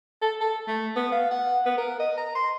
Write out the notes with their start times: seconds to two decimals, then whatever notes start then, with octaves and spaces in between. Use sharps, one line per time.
0.22 A4
0.40 A4
0.67 A3
0.96 B3
1.12 F5
1.31 F#5
1.66 B3
1.78 A#4
2.00 D#5
2.17 A#5
2.35 C6